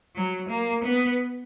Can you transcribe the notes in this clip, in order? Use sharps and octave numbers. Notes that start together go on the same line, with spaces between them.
F#3
A#3
B3